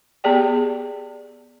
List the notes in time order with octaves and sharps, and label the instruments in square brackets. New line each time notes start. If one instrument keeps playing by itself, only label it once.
[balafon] B3 G4 G#4 D5 G5